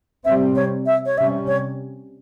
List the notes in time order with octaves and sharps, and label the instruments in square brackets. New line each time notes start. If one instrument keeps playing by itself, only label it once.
[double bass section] C3 G3 C4 [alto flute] E5
[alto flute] C#5
E5
C#5
[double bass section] C3 G3 C#4 [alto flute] E5
[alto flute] C#5